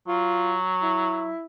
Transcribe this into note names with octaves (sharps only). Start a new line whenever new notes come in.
F#3 F4
E4